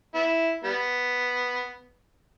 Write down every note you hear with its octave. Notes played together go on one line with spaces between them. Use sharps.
B3 E4
G3 B3